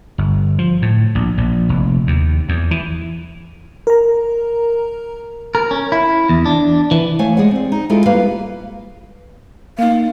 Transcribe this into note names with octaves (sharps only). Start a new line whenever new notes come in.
G1
F3
A2
A#1
A#1
F1
D#2
E2
E3
A#4 A#5
A#4
C#4
E4
E2
D4
E3
A3 C#5 F5 G#5
G#3 G#4 D5 F#5
C4 D5
D#4
G#3 E4 F4 G#4 A4
G3 A#3 B4 F5
A#3 D#4 F5